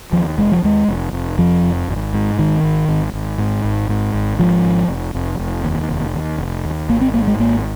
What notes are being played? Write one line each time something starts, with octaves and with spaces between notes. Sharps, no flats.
D#2 F3
F1 G#3
F3
D#2 G#3
F1
F1
F2 F3
F1
G#1
G#2
G#1 D#3
G#1
G#1
G#1
G#2
G#1
G#2
G#1
G#2 F3
G#1
F1
F1
F1
D#2
F1
D#2
F1
D#2
G#1 A#3
C4
G#2 A#3
G#3
G#1 A#3